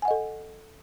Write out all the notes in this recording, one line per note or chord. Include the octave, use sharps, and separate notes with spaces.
A4 D#5 F#5 G#5